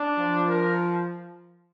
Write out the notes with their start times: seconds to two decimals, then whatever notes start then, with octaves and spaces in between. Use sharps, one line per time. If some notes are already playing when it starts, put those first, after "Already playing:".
Already playing: D4
0.20 F3
0.48 A#4